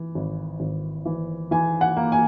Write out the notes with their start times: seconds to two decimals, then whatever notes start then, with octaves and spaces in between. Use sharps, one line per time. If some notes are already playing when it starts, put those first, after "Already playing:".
Already playing: E3
0.15 G#1
0.60 G#1
1.05 E3
1.51 E3 G#5
1.81 F#5
1.97 A#3
2.12 G#5